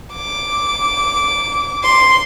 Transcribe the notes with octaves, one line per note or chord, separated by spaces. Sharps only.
D6
C6